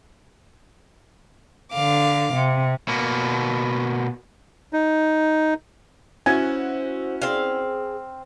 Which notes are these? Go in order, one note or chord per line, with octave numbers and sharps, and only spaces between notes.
D3 F5 D6
C3
B2 A#3
D#4
C#4 E4 F#4 C5 G#5
C4 G#4 F5